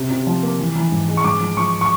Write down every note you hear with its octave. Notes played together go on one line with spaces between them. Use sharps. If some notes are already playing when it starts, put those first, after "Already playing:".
Already playing: C3
C3
F3
A#3
E3
E3
G#2
G#3
C#6
G#2 D6
F3
F3 C#6
C#6